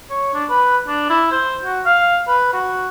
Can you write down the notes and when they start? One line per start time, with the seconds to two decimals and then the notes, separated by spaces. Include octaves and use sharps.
0.10 C#5
0.34 D4
0.50 B4
0.87 D4
1.09 E4
1.31 C5
1.63 F#4
1.85 F5
2.27 B4
2.53 F#4